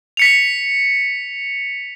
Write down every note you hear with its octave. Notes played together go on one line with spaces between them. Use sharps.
B6 C#7 F7